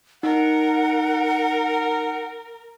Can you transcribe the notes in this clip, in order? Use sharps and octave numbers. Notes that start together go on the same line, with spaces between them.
D#4 A#4 F#5